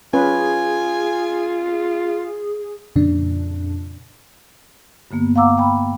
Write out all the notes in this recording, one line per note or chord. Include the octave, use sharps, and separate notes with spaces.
C#4 F4 G#4 B4 G#5
F2 A#2 C#3 D4
G2 D3 A#3 B3
F5 F#5 A#5 D6 E6
G5 B5